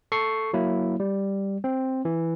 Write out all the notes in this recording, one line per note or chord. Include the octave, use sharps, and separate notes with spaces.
A4 C#6 C7
F#3 A#3 E4
G3
C4
E3